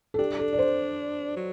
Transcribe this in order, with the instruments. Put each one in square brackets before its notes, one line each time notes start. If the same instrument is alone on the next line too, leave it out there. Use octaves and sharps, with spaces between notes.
[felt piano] A4
[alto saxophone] D4 [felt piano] G4
[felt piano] A4
D5
C5
[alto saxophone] F#3